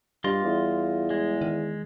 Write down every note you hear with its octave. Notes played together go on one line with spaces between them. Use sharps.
G2 G3 F4 D#5 C6
E2
G#3
D#3